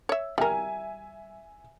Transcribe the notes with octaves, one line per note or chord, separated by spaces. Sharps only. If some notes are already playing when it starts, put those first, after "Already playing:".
C#5 E5
G3 A#4 E5 G#5